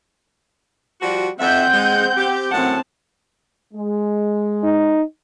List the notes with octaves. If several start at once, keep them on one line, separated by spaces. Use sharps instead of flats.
F3 G3 F#4
F2 C4 E5 F#5 G6
G#3
G4
F#2 A2 C4 F#5 A5
G#3
D#4